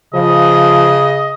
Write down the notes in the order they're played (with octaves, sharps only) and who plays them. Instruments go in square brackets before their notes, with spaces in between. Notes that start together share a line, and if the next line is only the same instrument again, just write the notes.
[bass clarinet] C#3 [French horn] F3 [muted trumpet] D#5